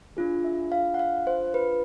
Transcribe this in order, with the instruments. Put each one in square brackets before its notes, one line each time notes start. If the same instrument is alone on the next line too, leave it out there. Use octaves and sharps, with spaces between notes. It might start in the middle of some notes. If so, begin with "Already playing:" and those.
[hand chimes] D4 F4 G#4
E5
F5
F#5
F5
C5
B4